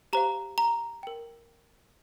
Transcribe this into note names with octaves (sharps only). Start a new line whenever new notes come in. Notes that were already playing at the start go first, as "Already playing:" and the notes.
G4 C5 F5 A#5
A#5
A#4 G5